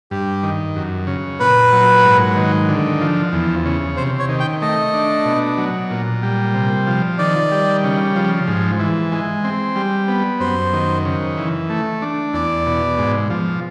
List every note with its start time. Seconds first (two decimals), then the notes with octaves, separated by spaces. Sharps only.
0.11 G2 G4
0.43 D#3
0.76 F#2
1.07 C#3
1.40 A#2 B4
1.73 F#3
2.04 G#2
2.36 D#3
2.68 D3
3.01 F3
3.32 E2
3.66 C#3
3.97 C3 C5
4.19 C#5
4.29 D#3
4.40 G5
4.62 A3 D#5
4.94 D4
5.25 B2
5.58 F#3
5.90 A#2
6.23 G3
6.55 C3
6.87 F3
7.18 D#3 D5
7.51 G3
7.84 C#3
8.16 F3
8.48 G#2
8.80 E3
9.12 G#3
9.44 C4
9.76 G3
10.08 B3
10.40 F#2 C5
10.73 D#3
11.05 C#3
11.37 E3
11.70 A3
12.02 D4
12.33 E2 D5
12.66 B2
12.98 G#2
13.30 F3